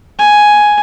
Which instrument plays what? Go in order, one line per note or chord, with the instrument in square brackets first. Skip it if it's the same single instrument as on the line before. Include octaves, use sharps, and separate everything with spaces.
[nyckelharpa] G#5